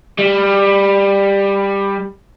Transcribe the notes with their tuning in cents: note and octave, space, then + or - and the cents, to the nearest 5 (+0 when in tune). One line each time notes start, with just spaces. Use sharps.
G3 +15